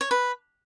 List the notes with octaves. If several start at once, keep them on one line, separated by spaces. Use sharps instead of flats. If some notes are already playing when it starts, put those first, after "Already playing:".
C#5
B4